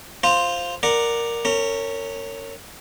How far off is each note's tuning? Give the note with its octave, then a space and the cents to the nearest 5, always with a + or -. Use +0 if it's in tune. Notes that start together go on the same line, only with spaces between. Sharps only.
F4 +0 C5 +0 A#5 -45
A#4 +0 D5 +10 F#5 +0
C#4 +0 A#4 -30